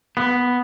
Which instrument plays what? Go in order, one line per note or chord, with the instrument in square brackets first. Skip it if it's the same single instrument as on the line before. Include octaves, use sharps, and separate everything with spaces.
[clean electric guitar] B3